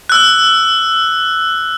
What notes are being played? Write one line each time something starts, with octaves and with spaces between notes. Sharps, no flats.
E6 F#6